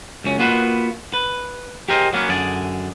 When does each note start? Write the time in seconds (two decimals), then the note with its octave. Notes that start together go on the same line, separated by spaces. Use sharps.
0.24 C#2 F#2 C#4
0.39 A#3 B3 F4 F#4 B4
1.14 B4
1.89 G4 G#4 A#4 C5 D#5
2.13 F#3 A#3 B3 C#4
2.29 F#2 D3 G#4 D5